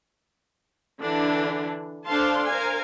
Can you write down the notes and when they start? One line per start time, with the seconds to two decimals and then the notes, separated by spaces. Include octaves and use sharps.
1.00 D3 E3 D4
2.08 D4 A4 C5 F5 A5 C6
2.47 A#4 C5 F5 G#5